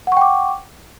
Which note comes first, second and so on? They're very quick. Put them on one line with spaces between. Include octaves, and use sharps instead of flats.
F#5 C#6 G5 D6